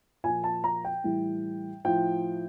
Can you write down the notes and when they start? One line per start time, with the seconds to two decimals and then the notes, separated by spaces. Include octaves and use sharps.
0.24 A#2 F3 G#5
0.44 A5
0.64 A#5
0.85 G5
1.04 A2 E3 G3
1.85 A2 F3 G5